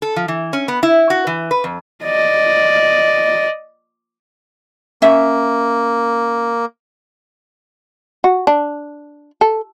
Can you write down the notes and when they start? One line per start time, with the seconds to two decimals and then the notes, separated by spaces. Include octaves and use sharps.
0.02 A4
0.16 F3
0.28 E3
0.53 C#4
0.68 B3
0.83 E4
1.10 F#4
1.27 E3
1.51 B4
1.64 F2
2.04 D5 D#5
5.02 A#3 C#4 E5
8.24 F#4
8.47 D4
9.41 A4